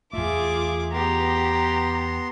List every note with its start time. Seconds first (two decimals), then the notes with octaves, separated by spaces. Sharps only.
0.13 E2 A3 F4 G#4 E5 D6
0.93 B3 G4 A#5 C6